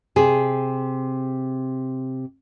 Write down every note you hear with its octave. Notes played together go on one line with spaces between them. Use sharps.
C3 G#4